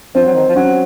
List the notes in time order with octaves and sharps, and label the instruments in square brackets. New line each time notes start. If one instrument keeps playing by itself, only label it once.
[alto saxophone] F3 [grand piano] C4
[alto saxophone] F#3
D#3
F3
[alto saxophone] F#3 [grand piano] C#4